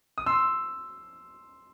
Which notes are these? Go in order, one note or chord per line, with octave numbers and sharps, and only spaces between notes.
D#6
C6 E6